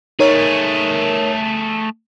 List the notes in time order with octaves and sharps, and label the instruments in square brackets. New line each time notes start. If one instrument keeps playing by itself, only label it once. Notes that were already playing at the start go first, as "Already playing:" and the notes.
[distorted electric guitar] A3 G#4 [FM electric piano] D#4 A#4 C#5